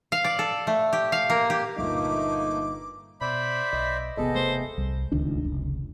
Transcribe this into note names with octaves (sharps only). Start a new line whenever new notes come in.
F5
D5
A4
A3
G4
F5
A#3
G4
G1 A#2 A3 A#3 D#4 D6
B2 C5 D5 E5 B5
B1 D#5
E1 C3 B3 G#4 A4 D#5
A3 C5
C2
D1 C#2 D#3 D4
F1 C#2